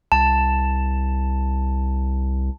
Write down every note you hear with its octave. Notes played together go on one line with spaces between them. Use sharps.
C2 A5